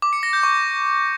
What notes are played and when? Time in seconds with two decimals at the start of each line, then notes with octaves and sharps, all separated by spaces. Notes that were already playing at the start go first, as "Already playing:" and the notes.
0.02 D6
0.13 C#7
0.23 A#6
0.33 G6
0.43 C#6